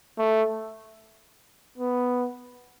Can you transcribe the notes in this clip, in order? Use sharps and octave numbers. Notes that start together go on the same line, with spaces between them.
A3
B3